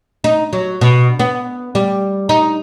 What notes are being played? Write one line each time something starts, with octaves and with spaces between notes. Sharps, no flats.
D#4
F#3
B2
B3
G3
D#4